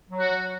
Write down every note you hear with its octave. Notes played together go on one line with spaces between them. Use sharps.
F#3
F#4
F#3